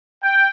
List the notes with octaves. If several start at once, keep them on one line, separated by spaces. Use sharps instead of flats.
G5